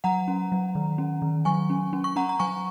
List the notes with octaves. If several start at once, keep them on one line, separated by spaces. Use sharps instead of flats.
F#3 F#5 A#5
C#4
F#3
D#3
C#4
D#3
F#3 G#5 C#6
C#4
C#4
C#6
C#4 F#5 A#5
A#5
F#3 G#5 C#6